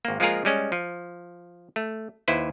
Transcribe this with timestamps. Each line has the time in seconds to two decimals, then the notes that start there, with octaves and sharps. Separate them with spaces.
0.05 G#1 A#3
0.20 F3 G#3 A#3 F4 G#4 A#4
0.45 G3 G#3 C#4
0.72 F3
1.76 A3
2.28 D#2 E4 B4 C5